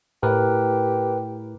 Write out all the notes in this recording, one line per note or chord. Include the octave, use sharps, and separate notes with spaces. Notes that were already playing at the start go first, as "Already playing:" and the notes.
A2 G4 A#4 B4